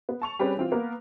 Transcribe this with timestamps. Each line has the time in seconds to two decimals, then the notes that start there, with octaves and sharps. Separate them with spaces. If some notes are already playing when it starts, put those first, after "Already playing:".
0.09 B3
0.22 A5 C#6 F7
0.39 G3 C4 C#4 G4 G#4 B4
0.57 E3 C4 F4
0.71 A#3 B3 A#4